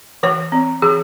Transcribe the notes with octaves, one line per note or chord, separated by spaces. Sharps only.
E3 C#5
C4
E3 G#4